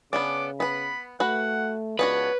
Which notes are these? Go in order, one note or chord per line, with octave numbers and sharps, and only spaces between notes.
C#3 B3 C#4 D4 D6
B3 B4 B5
A3 F#4 B4 F#5
C#2 B3 D4 F#4 B4 C#5